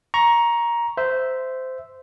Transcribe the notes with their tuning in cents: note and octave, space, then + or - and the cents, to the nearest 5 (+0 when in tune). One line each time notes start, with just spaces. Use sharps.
A#5 +15 C#6 +0
C5 -15 E5 +0